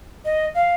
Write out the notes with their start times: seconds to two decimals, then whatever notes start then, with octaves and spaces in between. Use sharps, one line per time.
0.25 D#5
0.55 F5